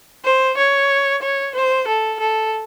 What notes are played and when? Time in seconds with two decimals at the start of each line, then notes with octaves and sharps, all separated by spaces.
0.25 C5
0.57 C#5
1.22 C#5
1.55 C5
1.87 A4
2.20 A4